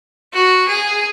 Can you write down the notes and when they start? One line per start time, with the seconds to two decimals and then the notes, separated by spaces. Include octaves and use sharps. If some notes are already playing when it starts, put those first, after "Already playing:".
0.34 F#4
0.68 G#4